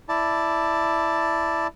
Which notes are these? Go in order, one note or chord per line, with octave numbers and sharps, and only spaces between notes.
E4 D5 A5